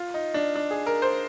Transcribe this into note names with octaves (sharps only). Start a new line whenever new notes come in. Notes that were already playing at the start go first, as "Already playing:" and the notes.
Already playing: F4
D#4
D4
D4
G#4
A#4
C5